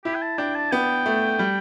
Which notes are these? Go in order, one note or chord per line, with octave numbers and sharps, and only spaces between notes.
E4 G4
G5
A5
D4 G5
A5
B3 G5
A3
G3